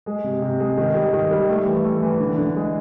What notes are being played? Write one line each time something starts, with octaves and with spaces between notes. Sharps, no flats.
G#3
C3
C3
G#3
D#3
G3
D#3
G3
A3
E3
A3
E3
D3
D3
G#3